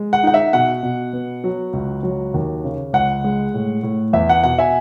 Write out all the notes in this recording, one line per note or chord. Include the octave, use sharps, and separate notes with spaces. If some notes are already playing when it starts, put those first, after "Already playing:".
Already playing: G#3
F#5
D#4 F#5
E5
B2 F#5
B2
B3
F#3
C#2
F#3
D#2
C#3
C#2 F#5
G#3
A2
A2
E2 E5
F#5
B2 F#5
E5 G#5